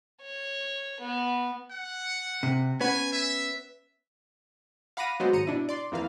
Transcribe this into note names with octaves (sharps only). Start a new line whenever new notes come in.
C#5
B3
F#5
C3
B3 C#4 G#5
E5
F5 F#5 B5 D6 A#6 D#7
F#3 G#3 B3 F#4 C5
G#1 A#5 C#7 D#7
B2 D4 E4
D5 C6
F2 E3 A#3 B4 F5